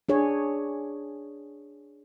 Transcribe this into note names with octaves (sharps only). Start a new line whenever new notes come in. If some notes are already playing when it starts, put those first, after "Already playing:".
D4 G#4 C#5